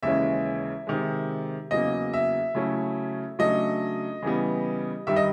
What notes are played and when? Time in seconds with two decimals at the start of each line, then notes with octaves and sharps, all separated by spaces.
0.03 D#2 C#3 E3 G#3 C#4 E5
0.87 C3 D#3 G#3
1.71 E2 C#3 F#3 A#3 D#5
2.13 E5
2.55 C#3 F#3 A3 C#4 E4
3.39 C#3 F#3 A3 D4 D#5
4.22 C#3 E3 G3 B3
5.07 G2 D#3 G3 E5
5.16 D#5